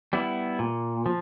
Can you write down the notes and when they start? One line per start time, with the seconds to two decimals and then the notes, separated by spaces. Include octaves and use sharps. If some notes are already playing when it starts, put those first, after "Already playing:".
0.13 G3 B3 E4
0.59 A#2
1.06 F3